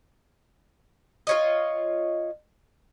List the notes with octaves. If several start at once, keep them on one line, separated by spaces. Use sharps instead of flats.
F4 C#5 D#5